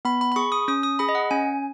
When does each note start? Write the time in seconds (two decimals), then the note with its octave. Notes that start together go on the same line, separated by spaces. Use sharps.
0.05 B3 B5
0.21 B5
0.32 B5
0.36 G#4 C#6
0.52 D#6
0.68 C#4 D#6
0.83 D#6
0.99 G#4 B5
1.09 D#5
1.15 F#5
1.31 C#4 G#5